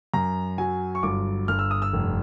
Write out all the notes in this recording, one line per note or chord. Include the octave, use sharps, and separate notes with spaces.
F#2 A#5
F#3 G#5
C#6
G1 D6
G1 F6
E6
D#6
E6
F1